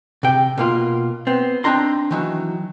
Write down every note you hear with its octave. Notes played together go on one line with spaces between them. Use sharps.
C3 G5
B2 A#3 F4
B3 C4
C4 D4 D#4 A#5 C6
D#3 E3 F#3